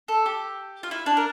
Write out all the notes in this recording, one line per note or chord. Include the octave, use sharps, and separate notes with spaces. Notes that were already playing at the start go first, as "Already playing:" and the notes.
A4
G4
F4
E4
D4
A#4